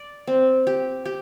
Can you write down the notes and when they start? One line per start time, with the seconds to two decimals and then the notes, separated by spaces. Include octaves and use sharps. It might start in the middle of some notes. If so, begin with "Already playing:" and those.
Already playing: D5
0.27 C4
0.67 G4
1.05 G4